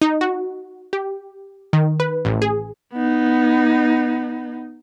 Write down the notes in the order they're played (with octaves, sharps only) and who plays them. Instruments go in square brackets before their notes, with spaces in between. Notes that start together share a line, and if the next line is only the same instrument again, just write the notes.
[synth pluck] D#4
F#4
G4
D#3
B4
A1
G#4
[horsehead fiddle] B3 D#4